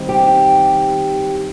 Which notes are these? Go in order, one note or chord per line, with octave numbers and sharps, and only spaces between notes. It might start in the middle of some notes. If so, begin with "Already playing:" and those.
Already playing: D#3 G3 C4
G4